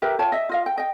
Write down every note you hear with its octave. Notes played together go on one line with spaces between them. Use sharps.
G4 A#4 B4 E5
F4 C#5 G5 A5
D#5 E5
F4 D#5 F5
G5
D#5 G5